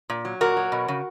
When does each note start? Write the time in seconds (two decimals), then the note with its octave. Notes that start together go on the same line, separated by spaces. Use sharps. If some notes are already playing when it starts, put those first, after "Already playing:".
0.10 A#2
0.25 F#3
0.41 A#2 F#4 A#4
0.57 F#3
0.72 B2
0.88 C#3